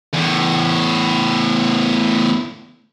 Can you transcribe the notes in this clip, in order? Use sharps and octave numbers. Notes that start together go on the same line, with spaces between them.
E2 A2